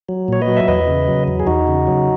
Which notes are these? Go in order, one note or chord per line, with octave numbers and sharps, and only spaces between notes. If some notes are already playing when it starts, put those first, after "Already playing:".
F#3
A#2 C#5
B4 D#5
F#3
E5
E2 B4 D#5
C#3
F#3
E2
G#4
E2 D#4 F#4
C#3
F#3